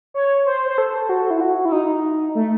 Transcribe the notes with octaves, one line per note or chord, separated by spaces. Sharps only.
C#5
C5
C5
A4
F#4
E4
F#4
E4
D#4
A3